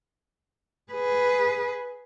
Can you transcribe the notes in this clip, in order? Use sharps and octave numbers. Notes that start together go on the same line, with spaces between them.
G#4 B4